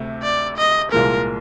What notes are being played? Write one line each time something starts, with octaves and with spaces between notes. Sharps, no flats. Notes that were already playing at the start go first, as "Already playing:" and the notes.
Already playing: D2 C3 A3
D5
D#5
C2 A#2 F3 G#3 A#4